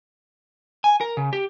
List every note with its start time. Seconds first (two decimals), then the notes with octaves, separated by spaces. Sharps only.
0.84 G#5
1.01 A#4
1.17 C#3
1.33 G4